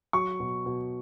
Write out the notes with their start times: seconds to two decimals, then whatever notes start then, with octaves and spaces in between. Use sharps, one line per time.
0.13 F#3 C#6
0.40 B2
0.66 B2